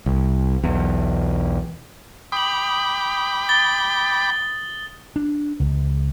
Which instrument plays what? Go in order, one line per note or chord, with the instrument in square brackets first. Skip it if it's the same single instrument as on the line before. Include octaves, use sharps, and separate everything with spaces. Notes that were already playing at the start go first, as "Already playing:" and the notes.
[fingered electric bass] C2
B1 E2
[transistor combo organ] G5 B5 D6 [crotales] D#6 F#7
[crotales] A6 G7
[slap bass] D4
C#2